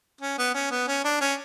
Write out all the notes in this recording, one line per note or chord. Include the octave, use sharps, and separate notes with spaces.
C#4
B3
C#4
B3
C#4
D4
C#4